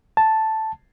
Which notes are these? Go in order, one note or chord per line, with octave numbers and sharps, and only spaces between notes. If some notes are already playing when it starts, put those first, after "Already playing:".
A5